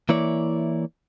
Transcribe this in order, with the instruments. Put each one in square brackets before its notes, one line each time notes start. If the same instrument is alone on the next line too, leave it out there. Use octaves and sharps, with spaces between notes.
[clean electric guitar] E3 A#3 E4 C#5 D5